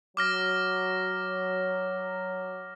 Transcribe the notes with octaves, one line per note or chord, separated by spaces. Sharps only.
F#3 D6 F6 A#6